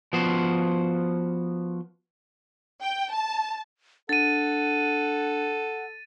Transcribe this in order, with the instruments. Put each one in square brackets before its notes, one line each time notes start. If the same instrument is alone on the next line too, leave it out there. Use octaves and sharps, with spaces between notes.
[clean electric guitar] F3 B3 F#4 C5
[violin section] G5
A5
[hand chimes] D4 [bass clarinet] A4 [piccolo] F#5 [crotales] A6 D#7